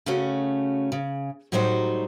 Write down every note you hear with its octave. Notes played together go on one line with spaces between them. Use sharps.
C#3 A3 C#4 F#4
C#3
A2 F#3 G3 D#4 F#4 C5